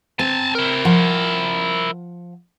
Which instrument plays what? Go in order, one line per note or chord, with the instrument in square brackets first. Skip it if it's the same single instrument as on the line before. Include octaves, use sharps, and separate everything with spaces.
[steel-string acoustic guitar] C4 [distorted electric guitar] G#5 A5
[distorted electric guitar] E4 A#4
[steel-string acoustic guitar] F3 F#5